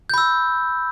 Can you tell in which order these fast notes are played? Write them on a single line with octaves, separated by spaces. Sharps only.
G6 B5 E6